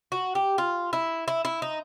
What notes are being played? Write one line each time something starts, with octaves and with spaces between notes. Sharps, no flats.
F#4
G4
F4
E4
E4
E4
D#4